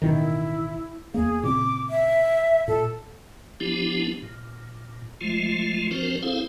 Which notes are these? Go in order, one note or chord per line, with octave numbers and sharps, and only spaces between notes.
A1 B2 D#3 E4
E2 A#3 G#4
A#2 C#3 C4 D6
E5
A#2 A4
F3 B3 D4 E4 G4
A#2
F3 G#3 A3 F4
F3 C4 D4 F#4 A#4 C5
C4 E4 G#4 A4 C5 F5